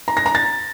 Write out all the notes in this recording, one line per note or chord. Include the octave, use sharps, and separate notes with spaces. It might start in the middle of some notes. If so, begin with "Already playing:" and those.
A#5
A#6
A#5
A6